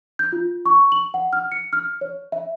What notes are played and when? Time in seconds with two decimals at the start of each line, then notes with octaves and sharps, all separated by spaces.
0.19 G6
0.33 F4
0.66 C#6
0.92 F#7
1.14 F#5
1.33 F6
1.52 C#7
1.73 F6
2.01 C#5
2.32 E5